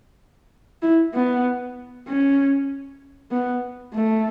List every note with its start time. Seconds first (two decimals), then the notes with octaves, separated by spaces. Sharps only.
0.82 E4
1.14 B3
2.08 C#4
3.31 B3
3.94 A3